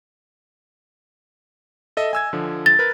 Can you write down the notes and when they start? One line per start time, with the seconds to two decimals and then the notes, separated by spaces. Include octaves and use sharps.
1.97 A4 D#5 E5
2.13 G#5 E6 G#6
2.33 D3 F3
2.66 A6
2.79 A#4 B4